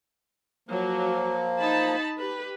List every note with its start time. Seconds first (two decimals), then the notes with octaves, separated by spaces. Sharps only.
0.69 F3 F#3 A#3
1.61 D#4 A5 B5
2.19 G4 B4